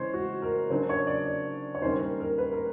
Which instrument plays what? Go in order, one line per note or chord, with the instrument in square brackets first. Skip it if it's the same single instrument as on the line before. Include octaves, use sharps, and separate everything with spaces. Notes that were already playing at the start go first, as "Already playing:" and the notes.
Already playing: [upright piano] C#3 E3 G#3 C#4 C5 C#5
F#4
A#4
C#3 F#3 A#3 D4 C5
C#5
D5
D5
C#5
D#3 G3 A#3 C#4 C5
A#4
A#4
B4
A#4